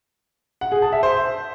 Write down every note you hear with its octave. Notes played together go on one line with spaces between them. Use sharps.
F#5
G#4
A5
E5
C5